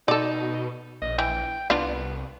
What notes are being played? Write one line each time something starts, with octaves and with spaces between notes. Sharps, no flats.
B2 D#4 A4 D5
A#1 D#5
E3 G5
C2 B3 D4 F4 F5